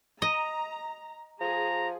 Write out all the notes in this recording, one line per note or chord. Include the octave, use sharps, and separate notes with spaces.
D#5 A#5
F3 G#4 A#5